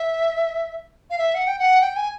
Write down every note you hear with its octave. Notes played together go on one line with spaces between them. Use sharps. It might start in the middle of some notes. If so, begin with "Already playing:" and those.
Already playing: E5
F5
E5
F#5
G5
F#5
G5
G#5